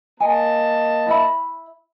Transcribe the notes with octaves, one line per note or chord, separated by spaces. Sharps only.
A#3 D#5 G#5 A5
E4 E5 B5